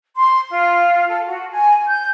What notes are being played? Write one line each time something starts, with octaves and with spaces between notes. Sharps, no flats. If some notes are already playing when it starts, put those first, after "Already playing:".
C6
F4
A4
F#4
G#5
G6